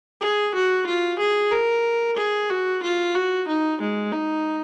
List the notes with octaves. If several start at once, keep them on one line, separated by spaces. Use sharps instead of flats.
G#4
F#4
F4
G#4
A#4
G#4
F#4
F4
F#4
D#4
G#3
D#4